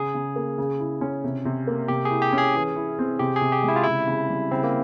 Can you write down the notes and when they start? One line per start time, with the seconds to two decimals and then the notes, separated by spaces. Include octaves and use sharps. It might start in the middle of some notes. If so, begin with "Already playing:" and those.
Already playing: C#3 G#4
0.14 C#3
0.36 A#3
0.58 C#3
0.80 E4
1.01 C#4
1.24 C3
1.45 C3
1.67 A#3
1.88 C3 G4
2.05 G#4
2.10 E4
2.22 G4
2.33 C#4 G#4
2.55 E3
2.76 E4
2.99 C4
3.19 C3 G4
3.36 G#4
3.41 C3
3.52 G4
3.63 G#3
3.68 E4
3.76 F4
3.84 C#3 E4
4.08 C#3
4.29 G3
4.51 C#3 C4
4.64 A#3